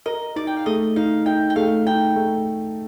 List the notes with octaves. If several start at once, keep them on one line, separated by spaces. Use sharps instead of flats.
A#4 D#5
D#4 D5
G5
F5
A3 D#5
D#4 F5
D#4 G5
G5
A3 F5
D#4 G5
A3